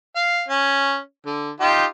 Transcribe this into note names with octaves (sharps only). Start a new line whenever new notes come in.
F5
C#4
D3
D#4 F4 G4